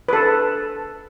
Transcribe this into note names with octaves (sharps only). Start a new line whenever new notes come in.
A4 B4